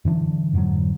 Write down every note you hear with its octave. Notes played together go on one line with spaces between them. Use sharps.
F#2 D3 E3 D4
F2 G#2 D3 F#3